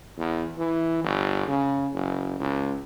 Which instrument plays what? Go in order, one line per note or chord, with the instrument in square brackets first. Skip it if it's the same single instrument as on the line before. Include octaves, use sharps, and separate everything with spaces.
[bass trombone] E2
E3
G1
C#3
F#1
C#2